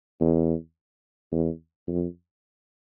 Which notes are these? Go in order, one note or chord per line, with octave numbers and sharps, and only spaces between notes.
E2
E2
F2